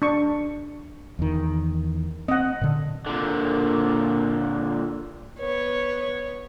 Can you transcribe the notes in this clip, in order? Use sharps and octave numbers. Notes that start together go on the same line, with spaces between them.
D4 C#6
E2 D#3
C4 D#5 F#5
A#2 D3
A#2 D3
B3 C#5